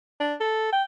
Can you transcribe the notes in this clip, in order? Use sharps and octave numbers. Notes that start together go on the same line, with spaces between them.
D4
A4
G5